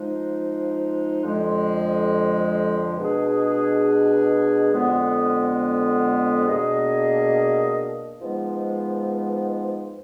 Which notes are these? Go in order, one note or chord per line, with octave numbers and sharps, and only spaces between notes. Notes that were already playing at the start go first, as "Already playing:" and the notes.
Already playing: F3 G#3 D#4
F2 D3 F3 G#3
B2 G#3 D4 G#4 B4
F2 D3 G#3 B3
B2 A#3 D4 G#4 D#5
G#2 F3 G#3 B3